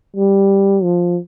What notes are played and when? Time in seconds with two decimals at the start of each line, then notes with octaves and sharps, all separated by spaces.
0.16 G3
0.83 F3